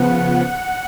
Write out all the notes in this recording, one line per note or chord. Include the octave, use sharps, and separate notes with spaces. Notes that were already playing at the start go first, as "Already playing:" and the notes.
Already playing: C#3 F3 B3 F#5